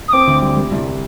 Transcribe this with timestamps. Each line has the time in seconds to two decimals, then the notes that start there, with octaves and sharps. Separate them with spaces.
0.08 D#6
0.13 C4 D6
0.27 D2
0.42 G3
0.57 G3
0.71 C2